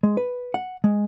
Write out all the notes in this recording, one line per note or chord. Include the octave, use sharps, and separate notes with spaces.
G#3
B4
F#5
G#3